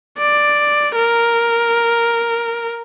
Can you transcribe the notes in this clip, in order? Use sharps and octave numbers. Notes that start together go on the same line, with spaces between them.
D5
A#4